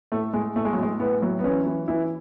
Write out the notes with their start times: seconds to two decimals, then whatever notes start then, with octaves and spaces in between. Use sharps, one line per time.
0.12 A2 A3
0.33 A2 G#3
0.56 A2 A3
0.65 G#3
0.73 F#3
0.78 A2 G#3
1.00 A2 B3
1.22 F#3
1.39 B3
1.44 E3 C#4
1.67 E3
1.88 E3 E4